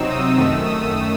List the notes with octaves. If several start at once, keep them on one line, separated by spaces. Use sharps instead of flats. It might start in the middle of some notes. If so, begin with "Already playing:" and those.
Already playing: C3 F#3 C4 D#4 E6
D#6
F#2 D#3 A3 E6
D#6